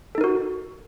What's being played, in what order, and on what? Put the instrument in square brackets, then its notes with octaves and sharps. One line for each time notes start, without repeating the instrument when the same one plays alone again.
[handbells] A4
D#4
A#4
F#4